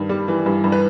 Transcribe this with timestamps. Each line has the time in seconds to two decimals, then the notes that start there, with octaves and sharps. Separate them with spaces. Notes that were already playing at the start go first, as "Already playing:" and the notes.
Already playing: G2 D#3
0.09 G3
0.28 E3
0.46 G2
0.64 G2
0.72 B4